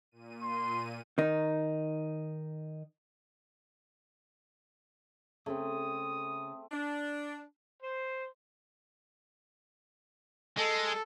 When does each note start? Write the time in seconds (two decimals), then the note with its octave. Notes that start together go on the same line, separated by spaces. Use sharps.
0.12 A#2 D#7
0.43 C6
1.18 D#3 D#4
5.46 C#3 A3 C4 D#6
6.72 D4
7.82 C5
10.57 G#3 A4